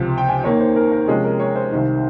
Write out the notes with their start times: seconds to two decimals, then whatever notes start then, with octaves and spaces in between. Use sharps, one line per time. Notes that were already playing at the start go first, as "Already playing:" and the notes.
Already playing: C#2 C3 F3
0.18 G5
0.29 G#5
0.44 D#2 D#3 A#3 C#5
0.60 C5
0.76 A#4
0.92 A#4
1.08 C3 F3 G#3 C#4 G#4
1.24 A#4
1.39 C#5
1.56 C5
1.72 C2 C3 D#3